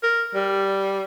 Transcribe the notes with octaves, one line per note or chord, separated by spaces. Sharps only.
A#4
G3